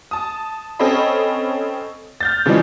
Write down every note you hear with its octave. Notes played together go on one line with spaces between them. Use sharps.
A5 D#6
C4 C#4 A4 C#5 D#5 B5
F6 G6 A6
C#3 E3 F3 G3 G#3